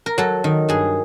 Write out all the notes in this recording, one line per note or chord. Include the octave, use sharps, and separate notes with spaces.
A#4
F#3 A4
D#3
G2 G#4